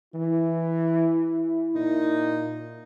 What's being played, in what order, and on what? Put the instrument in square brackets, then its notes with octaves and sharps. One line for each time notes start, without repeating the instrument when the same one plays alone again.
[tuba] E3 [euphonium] E4
[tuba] A#2 [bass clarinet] D#4